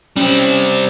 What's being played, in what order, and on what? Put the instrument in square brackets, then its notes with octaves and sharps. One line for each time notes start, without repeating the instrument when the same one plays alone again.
[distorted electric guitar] G3 C4 [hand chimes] C#4